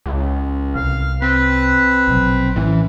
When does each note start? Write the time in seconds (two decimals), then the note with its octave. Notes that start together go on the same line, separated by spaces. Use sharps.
0.06 C#2
0.75 C2 F5
1.22 C4 B4
2.08 A#1 B2 F#3
2.56 A2 E3 C4 C#4